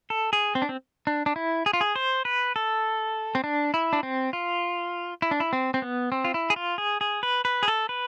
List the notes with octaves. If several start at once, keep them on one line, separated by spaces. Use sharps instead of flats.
A4
G#4
C4
D4
C4
D4
D4
E4
G#4
F4
G#4
C5
B4
A4
C4
D4
E4
D4
C4
F4
E4
D4
E4
C4
C4
B3
C4
F4
E4
G#4
F4
G#4
G#4
B4
B4
G#4
A4
B4